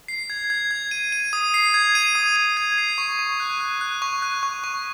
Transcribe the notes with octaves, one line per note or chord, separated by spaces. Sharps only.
C7
G#6
G#6
G#6
D#7
D#7
D#6
C7
G#6
D#7
D#6
D#7
G#6
C7
C#6
C#6
F#6
F#6
F#6
C#6
F#6
C#6
C#6